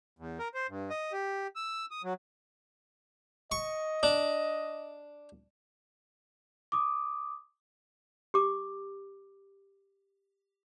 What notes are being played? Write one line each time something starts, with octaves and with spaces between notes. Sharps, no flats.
E2
A#4
C5
G2
D#5
G4
E6
D#6
F#3
D#5 C#6
D4
D6 D#6
G4 D6